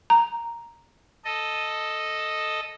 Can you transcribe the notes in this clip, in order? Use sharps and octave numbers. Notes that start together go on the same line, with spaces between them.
A#5
A4 D#5